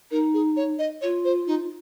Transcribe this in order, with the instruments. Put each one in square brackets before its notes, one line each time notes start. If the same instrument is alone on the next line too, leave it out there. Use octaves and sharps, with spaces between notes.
[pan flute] D#4 [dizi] A#4
[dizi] G#4
C#5
D#5
[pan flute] F4 [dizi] C#5
[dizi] C5
D#4